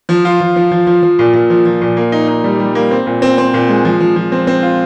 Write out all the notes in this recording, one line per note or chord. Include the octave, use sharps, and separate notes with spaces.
F3
F4
F3
F3
F3
F3
F3
A#2
A#2
F3
F3
A#2
A#3
D#4
D#4
G3
G3
A#3
C4
A#2
C4
C4
A#2
G#3
F3
F3
F3
C4
C4
F4